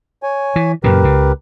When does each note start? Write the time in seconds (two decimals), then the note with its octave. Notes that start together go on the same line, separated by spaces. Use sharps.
0.23 C#5 G#5
0.56 E3
0.84 F#2 A#2 C#3 G4 A#4 B4
1.03 C#2 C#3